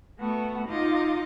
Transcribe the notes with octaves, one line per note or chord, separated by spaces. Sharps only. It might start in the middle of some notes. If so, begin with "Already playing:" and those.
A3 B3 F#4
D#4 F4 D#5 D6